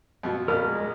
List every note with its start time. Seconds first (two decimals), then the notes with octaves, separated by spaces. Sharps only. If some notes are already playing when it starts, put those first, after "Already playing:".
0.23 F2 B2
0.48 A#1 A#4 F6
0.66 G#3